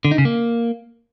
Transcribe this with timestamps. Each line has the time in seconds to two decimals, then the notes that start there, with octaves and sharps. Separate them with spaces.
0.05 D3
0.11 D#4
0.18 C#3
0.25 A#3